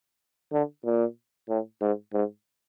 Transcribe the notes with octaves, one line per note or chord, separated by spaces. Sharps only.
D3
A#2
A2
G#2
G#2